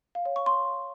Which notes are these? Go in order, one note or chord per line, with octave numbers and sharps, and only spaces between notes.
F5
C#5
C#6
C6